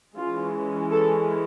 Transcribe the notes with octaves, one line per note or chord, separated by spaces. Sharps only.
E3 G#3 C#4 F4
A4